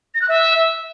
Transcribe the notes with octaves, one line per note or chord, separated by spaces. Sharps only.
A#6
F#6
E5